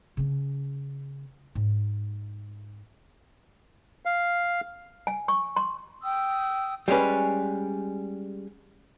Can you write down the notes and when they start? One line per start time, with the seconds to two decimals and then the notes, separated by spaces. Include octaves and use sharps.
0.17 C#3 C#4
1.55 G#2
4.05 F5
5.07 G#5
5.28 C#6
5.56 C6
6.03 G5 D#6 E6
6.88 G3 G#3 C#4 B4